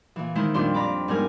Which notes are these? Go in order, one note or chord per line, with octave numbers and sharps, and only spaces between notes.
A#2 E3
D#3 G#3 E4 C5
F2 A#2 G3 D4 C6
D5 A#5 B5 D6
G#2 G3 B3 A#4 G#5